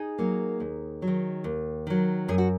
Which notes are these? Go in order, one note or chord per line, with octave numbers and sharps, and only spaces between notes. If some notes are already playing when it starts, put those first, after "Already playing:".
Already playing: D#4 G#4
F#3 A#3
D#2
F#3
D#3
D#2
D#3 F#3
F#2 G#4
F#4